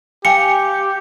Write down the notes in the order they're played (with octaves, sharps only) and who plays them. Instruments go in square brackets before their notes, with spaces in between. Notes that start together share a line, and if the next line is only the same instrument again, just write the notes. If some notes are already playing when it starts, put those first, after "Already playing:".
[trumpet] G4 [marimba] F5 G5 G#5 [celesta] C#7